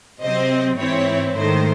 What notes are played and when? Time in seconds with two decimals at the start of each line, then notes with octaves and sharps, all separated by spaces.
0.21 C3 F#3 C4 C5 D#5
0.78 G#2 E3 C4 E4 C#5
1.35 G#2 D#3 A3 C5